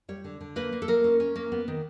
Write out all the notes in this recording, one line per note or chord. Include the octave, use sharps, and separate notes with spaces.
G3 C#5
D3
D3
A#3 B4
A#3
A4
A#3 A#4
C#4
C#4
A#3
B3
D#3